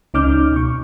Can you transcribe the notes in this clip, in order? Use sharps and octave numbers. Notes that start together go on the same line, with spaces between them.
C#2 C#4 D#4 D6 F6 G6
B2 C#6